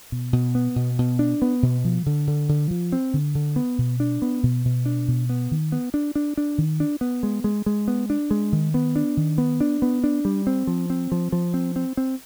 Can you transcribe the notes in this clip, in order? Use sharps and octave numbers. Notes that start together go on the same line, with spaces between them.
B2
B2
B3
B2
B2
D4
B3
B2
F3
D3
D3
D3
F3
C4
D3
D3
B3
B2
D4
B3
B2
B2
D4
B2
B3
D#3
B3
D4
D4
D4
D#3
D4
B3
G#3
G#3
G#3
B3
D4
G#3
D#3
B3
D4
D#3
B3
D4
B3
D4
G3
C4
F3
C4
F3
F3
C4
C4
C4